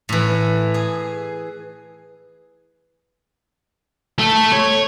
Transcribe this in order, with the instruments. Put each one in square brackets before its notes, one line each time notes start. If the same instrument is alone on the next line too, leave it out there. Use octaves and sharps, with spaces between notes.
[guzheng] A2 E3
G#4
[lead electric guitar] A3
C#5